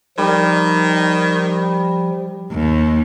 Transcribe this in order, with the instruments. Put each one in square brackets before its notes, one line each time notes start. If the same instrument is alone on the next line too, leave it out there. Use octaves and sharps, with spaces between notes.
[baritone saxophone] D#3 [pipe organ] F3 [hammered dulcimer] G3
[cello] D#2